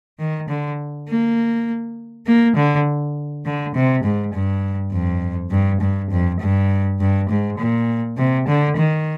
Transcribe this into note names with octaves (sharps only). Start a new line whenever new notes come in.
D#3
D3
A#3
A#3
D3
D3
C3
G#2
G2
F2
G2
G2
F2
G2
G2
G#2
A#2
C3
D3
D#3